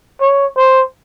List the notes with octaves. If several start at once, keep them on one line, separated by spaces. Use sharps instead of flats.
C#5
C5